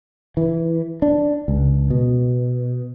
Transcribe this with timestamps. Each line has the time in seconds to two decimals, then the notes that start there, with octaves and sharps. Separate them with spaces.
0.37 E3
1.02 D4
1.48 C#2
1.90 B2